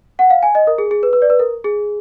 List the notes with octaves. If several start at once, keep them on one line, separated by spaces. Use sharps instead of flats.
F#5
F5
G#5
D#5
A#4
G#4
G#4
B4
B4
D5
B4
A#4
G#4